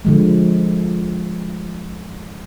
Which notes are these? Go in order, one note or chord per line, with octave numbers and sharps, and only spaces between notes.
D3 F3 G#3